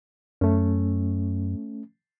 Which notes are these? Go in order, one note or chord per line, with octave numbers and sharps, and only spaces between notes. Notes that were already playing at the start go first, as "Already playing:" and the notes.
F#2 A3 C#4